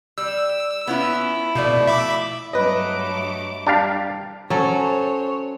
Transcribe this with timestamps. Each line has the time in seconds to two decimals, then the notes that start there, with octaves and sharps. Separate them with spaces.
0.18 G3 E6
0.87 B3 C#4 E4 F4
1.55 B2 F3 A3 D5
1.87 E5 B5 D6
2.53 G2 F#3 A3 B4 D#5 D6
3.67 G3 D4 G4 F5
4.50 F#3 C#4 A4 C5 C#5